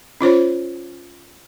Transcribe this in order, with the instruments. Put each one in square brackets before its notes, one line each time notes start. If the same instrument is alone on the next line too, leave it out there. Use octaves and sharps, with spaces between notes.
[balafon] C#4 F4 C5 C#5